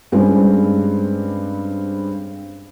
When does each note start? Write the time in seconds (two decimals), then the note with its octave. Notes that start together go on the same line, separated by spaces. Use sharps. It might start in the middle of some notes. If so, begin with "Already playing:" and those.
0.12 G2 G3 G#3 C4 C#4